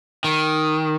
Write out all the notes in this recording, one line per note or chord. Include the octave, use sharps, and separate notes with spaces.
D#3